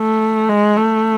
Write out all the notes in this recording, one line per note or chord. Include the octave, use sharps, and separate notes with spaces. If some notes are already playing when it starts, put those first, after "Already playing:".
Already playing: A3
G#3
A3